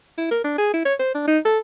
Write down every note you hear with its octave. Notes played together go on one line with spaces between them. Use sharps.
E4
A#4
D4
G#4
E4
C#5
C5
D4
D#4
A4